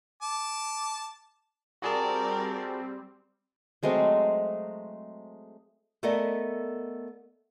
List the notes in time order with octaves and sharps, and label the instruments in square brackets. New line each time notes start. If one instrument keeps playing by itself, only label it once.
[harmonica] A5 D6
[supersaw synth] G3 C4 [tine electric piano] F#4 G#4 A5 [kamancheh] A#4 D5
[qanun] F#3 G#3 A3 C4
[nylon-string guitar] A3 B3 A4 A#4 D5 D#5